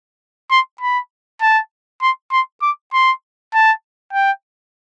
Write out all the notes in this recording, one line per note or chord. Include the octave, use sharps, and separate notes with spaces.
C6
B5
A5
C6
C6
D6
C6
A5
G5